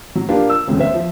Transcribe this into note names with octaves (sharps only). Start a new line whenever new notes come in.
F#3
A#3 D4 F4 G4
E6
E1 D2 C#3
C5 E5
F3